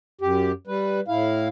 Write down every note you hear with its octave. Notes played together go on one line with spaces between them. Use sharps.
F#2 G4
G3 B4
A2 E4 F5